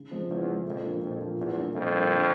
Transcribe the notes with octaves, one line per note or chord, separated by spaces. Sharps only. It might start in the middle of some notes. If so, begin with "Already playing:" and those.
Already playing: C#3
F3 G#3 C4
E2 C#3
F3 G#3 C4
F2 A#2
F3 A#3 D4 F4
F2 A#2
F3 A#3 D4 F4
E2 A#2
G3 A#3 D4
F2 A#2
G3 A#3 D4
D3